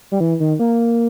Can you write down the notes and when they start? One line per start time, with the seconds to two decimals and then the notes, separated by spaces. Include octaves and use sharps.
0.12 G3
0.20 E3
0.40 D#3
0.59 A#3